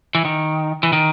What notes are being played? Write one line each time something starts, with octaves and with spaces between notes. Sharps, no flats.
E3
D#3
E3
D#3